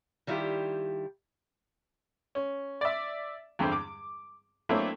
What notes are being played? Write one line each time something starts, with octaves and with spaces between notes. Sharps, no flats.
D#3 G3 E4 F4 G4
C#4
D5 E5
E2 G2 D3 G3 C4
D6
F#3 A3 A#3 C4 D4 E4